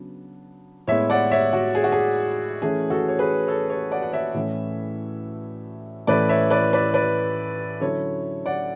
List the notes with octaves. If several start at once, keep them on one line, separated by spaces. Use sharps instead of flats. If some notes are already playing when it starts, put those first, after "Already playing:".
Already playing: C#3 F#3 B3 D4
A2 G#3 B3 E4 C#5 E5
D5 F#5
C#5 E5
F#4
G#4
F#4
G#4
E3 A3 C#4 G#4
F#4 A4
C#5
G#4 B4
A4 C#5
A4 C#5
D5 F#5
F#5
C#5 E5
A2 E3 A3 C#4
A2 E3 A3 C#4 E4 B4 D5
C#5 E5
B4 D5
B4 D5
B4 D5
D3 F#3 C#4 E4 A4 C#5
D5 F#5